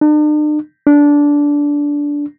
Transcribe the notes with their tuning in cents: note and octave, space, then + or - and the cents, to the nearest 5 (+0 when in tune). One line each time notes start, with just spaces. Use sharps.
D4 +45
D4 -15